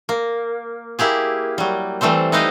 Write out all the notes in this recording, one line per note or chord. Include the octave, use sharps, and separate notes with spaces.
A#3
A#3 E4 G4 G#4
F#3 G3
E3 G3 A3 C4 C5
D#4 E4 B4 C5 D#5 F5